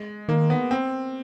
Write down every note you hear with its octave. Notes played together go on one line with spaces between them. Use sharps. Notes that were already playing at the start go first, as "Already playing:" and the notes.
Already playing: G#3
D#3 A#3
B3
C4